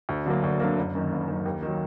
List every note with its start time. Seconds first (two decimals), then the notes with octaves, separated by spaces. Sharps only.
0.09 D2
0.26 D3 F#3 A#3
0.44 D2
0.60 D3 F#3 A#3
0.78 F#1
0.95 F#2 D#3
1.12 F#1
1.28 F#2 D#3
1.45 D#2
1.62 D#3 F#3